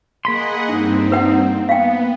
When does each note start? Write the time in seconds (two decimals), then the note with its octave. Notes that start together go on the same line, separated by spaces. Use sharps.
0.25 A#3 G#4 D#5 F#5 B5 C6
0.69 G2 C4 D4 D#4
1.12 B4 F#5
1.69 B3 F5 G5